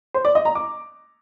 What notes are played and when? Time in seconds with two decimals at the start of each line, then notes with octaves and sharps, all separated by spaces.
0.14 C5
0.25 D5
0.35 D#5
0.45 A#5
0.55 D6